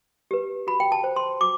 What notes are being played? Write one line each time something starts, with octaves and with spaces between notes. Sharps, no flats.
G4 B4
F#4 B5
G5
A5
C5
C6
F#4 D6